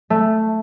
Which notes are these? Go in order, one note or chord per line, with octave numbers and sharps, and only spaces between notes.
A3